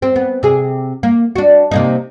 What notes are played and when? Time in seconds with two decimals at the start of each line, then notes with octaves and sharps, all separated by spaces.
0.02 C4
0.16 B3
0.43 C3 G#4
1.03 A#3
1.36 D4 F#4
1.71 C3 A#3 D#4